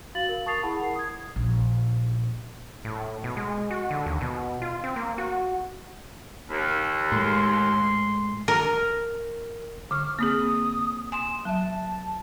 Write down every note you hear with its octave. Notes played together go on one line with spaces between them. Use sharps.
F#4 F5 A6 F#7
A#4
A5 C#6 D#6 A6 C7 F7
E4 G#4 A#4 F#5 A5 B5
C7
D#6 G#6
A#1
A2
B2
G#3
F#4
D3
D#2
B2
F4
C4
A#3
F#4
D#2
A2 G#3 C6
A#4
D3 C#6 F6
A#3 C4 G#4 D#6
G#5 C6 D#6 E7
F#3 E5 A5